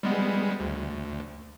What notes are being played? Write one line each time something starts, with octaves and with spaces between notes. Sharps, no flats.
G3 G#3 B3
D2